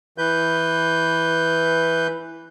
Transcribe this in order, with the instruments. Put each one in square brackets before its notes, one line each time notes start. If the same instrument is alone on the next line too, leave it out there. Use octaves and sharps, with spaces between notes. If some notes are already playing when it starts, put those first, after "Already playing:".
[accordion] E3 B4 G6